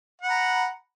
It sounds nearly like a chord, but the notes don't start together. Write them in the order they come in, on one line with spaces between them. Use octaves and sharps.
F#5 B5 A#5